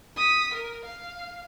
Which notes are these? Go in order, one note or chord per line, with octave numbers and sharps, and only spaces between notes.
D#6 B6
A#4
F5